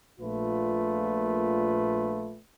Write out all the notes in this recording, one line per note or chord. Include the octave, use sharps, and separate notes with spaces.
A#1 A#2 A3 F4 B4